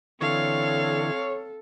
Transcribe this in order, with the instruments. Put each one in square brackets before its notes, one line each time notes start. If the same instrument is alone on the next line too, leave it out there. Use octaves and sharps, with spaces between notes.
[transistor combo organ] D3 E3 [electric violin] C4 F5 [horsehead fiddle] A4 [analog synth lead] C#5